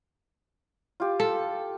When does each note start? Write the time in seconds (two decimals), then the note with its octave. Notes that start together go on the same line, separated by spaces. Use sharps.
1.00 F4 G4
1.20 A4